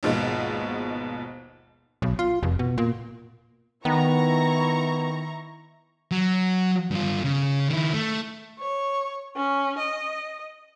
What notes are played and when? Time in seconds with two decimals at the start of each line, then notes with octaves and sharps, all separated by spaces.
0.03 G#1 D#2 B2 F3 G#3
2.02 B1
2.19 F4
2.43 F1
2.59 B2
2.78 A#2
3.85 D#3 B3 E4 A#5 C#6
6.11 F#3
6.91 G2 F4
7.24 C#3
7.69 D#3 E4
7.93 A3
8.59 C#5
9.36 C#4
9.78 D#5